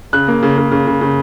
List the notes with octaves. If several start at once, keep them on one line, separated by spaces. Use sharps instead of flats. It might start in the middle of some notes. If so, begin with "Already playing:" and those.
C#3 F#6
A#3
C#3
C#3
C#3
C#3
C#3